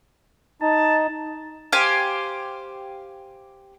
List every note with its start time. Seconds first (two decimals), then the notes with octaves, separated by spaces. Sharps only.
0.62 D#4 A5
1.72 G4 C5 F5 G#5